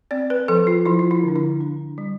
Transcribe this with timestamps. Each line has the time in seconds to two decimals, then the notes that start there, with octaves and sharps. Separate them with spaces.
0.11 C4 D5
0.30 B4
0.48 F3 A4
0.67 F4
0.85 F3 E4
0.99 F4
1.11 E4
1.23 D3 D4
1.36 E4
1.61 D4
1.98 G3